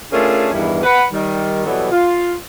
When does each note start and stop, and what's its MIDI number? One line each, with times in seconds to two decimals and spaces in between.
0.11 0.48 57
0.11 0.48 61
0.11 0.48 62
0.11 0.48 65
0.11 0.48 68
0.11 0.48 70
0.53 0.81 40
0.53 0.81 43
0.53 0.81 51
0.53 0.81 52
0.53 0.81 55
0.53 0.81 64
0.83 1.03 71
0.83 1.03 78
1.13 1.65 51
1.13 1.65 55
1.66 1.87 47
1.66 1.87 52
1.66 1.87 54
1.66 1.87 55
1.66 1.87 59
1.66 1.87 69
1.91 2.33 65